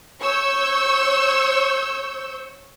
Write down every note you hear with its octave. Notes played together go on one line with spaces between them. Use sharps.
C#5 C#6 E6 G6